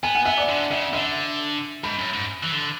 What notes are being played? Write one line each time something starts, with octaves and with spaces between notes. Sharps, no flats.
B3 G#5
F#5
B3 E5
D5
D3
C#3 E5
D3 E5
G#2 B5
F#2
G#2
E3
D3